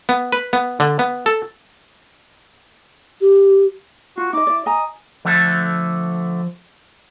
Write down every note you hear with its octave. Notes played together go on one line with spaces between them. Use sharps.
B3
B4
B3
D3
B3
A4
G4
F4 F#4
D#4 D#5 D6
E4 D5
D#5 G#5 A#5 D#6
D3 F3 A3 A4